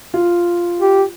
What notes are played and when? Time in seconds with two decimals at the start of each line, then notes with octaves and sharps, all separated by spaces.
0.14 F4
0.80 G4